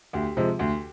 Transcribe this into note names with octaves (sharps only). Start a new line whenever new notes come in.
D2 G4
C3 F3 G#3
D2